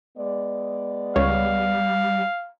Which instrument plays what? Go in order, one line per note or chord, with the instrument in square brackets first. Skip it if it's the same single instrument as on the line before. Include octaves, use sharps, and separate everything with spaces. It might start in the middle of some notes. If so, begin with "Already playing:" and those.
[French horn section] G#3 B3 D5
[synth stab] C#2 C#5 [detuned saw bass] G3 [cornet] F5